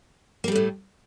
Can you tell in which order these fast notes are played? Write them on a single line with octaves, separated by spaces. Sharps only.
A#3 G3 A3 A2